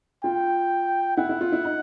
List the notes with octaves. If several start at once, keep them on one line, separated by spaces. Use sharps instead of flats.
F4 G5
E4 F#5
E4
F4
E4
D#4